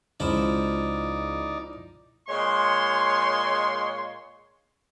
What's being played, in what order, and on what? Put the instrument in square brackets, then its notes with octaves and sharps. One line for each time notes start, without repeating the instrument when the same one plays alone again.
[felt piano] C#2 [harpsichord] F3 E4 [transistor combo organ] D#4 D5
[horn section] A#2 G#3 C#5 C6